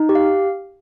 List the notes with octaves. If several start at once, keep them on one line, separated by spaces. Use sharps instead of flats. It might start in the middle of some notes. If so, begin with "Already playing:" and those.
Already playing: D#4
G4
F5